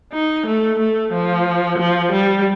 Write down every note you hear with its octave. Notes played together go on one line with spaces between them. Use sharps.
D#4
A3
A3
F3
F3
G3